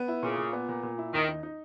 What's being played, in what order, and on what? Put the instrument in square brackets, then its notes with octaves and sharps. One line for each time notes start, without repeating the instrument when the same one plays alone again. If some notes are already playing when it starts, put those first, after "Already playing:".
Already playing: [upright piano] B3
E4
[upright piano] A#2 [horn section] C#3
[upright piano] A#2
B3
A#2
A#2
E4
[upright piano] D#2 [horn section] D#3
[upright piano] D#4
D#4